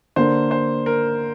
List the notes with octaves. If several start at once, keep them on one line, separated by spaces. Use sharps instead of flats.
D3 A#3 D4 C5
C5
A#4